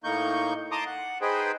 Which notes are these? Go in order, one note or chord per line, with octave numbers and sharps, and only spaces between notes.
A2 A#3 D#4 C#6 G6
D#5 A5 A#5 C6 D6 D#6
F#5
D#4 G#4 B4 C5 G5